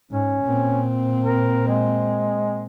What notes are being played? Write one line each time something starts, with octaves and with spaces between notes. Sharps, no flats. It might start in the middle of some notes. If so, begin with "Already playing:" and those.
G#2 C#4
A#2 C4
A#4
G#3